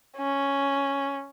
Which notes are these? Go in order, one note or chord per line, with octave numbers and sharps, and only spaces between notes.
C#4